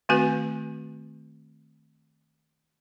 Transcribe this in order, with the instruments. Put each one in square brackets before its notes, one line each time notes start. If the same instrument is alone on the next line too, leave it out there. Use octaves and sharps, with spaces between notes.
[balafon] D#3 A3 C4 F#4 B4 G#5